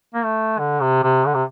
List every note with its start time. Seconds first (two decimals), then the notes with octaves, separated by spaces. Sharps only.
0.14 A#3
0.25 A3
0.59 D3
0.82 C3
1.03 C3
1.26 D3
1.35 C3